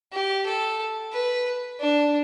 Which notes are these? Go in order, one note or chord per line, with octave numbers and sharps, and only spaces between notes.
G4
A4
B4
D4